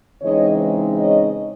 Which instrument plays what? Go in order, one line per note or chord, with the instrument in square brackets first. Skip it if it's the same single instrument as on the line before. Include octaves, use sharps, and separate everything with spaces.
[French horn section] C#3 E3 G#3 C4 D#4 C#5 D#5
C#5 D#5